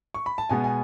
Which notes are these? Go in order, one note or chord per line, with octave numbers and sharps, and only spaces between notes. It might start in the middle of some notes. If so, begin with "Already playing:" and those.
C#6
B5
A5
B2 G#3 B3 G#5
G#5